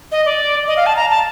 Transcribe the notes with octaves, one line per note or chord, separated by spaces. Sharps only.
D#5
D5
D#5
F5
A5
A#5
A5